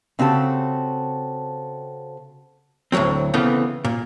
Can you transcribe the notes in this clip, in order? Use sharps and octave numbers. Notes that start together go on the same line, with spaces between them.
C#3 C4 F#4 G4 A4 A5
D2 A2 F3 F#3 C4
C#3 E3 A3 B3 C4
A#2